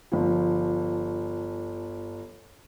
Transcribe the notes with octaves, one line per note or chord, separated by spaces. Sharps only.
G1 F3